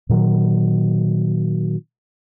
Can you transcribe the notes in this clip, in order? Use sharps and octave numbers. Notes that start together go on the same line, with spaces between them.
A#2 D#3 F#3